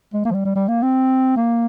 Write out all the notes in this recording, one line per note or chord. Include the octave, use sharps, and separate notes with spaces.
G#3
A#3
F3
G3
G3
G3
A#3
C4
A#3